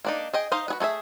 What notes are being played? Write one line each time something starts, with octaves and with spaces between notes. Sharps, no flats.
A#3 D4 D#4
G#4 D#5 G5
D#4 C5 D#5 F5
F#4 G#4 B4
A3 G#4 A4 E5